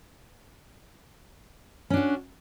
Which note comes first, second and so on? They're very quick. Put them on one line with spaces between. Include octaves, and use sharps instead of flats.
C#4 D4 F#4